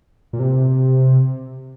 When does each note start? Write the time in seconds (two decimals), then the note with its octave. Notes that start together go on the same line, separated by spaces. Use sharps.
0.33 A#2
0.39 C3